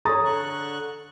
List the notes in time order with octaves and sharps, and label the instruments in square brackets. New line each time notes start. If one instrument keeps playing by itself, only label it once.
[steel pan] G#4 A4 C#5 [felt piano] A#5 D#6 A6
[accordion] D3 C#6 F#6